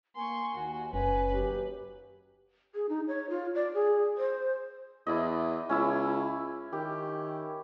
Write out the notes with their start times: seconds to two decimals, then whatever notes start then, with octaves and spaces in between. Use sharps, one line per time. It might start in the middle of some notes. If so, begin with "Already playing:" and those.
0.16 A#3 G#5 C6 C#6
0.54 D#2 F#4
0.93 F#1 C#4 B4 G#5
1.33 D#2 F#3 G4
2.74 G#4
2.89 D#4
3.08 C#5
3.30 F4
3.55 D5
3.74 G#4
4.18 C5
5.07 E2 E4 D5 D#5
5.69 C#2 C#4 E4 E6
6.73 D#3 G4